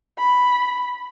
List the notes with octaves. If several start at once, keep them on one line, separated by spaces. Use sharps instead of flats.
B5